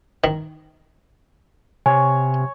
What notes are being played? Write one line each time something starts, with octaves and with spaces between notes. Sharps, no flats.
D#3
C3 C#5 G#5